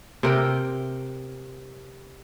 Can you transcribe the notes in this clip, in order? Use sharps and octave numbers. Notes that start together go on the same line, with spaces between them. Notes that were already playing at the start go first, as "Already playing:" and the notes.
C3 A#4 G5